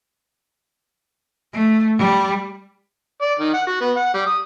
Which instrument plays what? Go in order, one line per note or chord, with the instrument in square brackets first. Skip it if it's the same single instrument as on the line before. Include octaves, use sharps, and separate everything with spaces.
[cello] A3
G3
[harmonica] D5
D#3
F#5
F#4
B3
F#5
G3
D#6